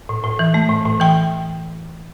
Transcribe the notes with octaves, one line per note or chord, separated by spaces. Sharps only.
A2
A2
E3
A3
A2
A2
E3 G5